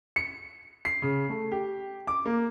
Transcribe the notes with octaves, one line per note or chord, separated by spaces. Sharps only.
C#7
C7
C#3
A3
G4
D6
A#3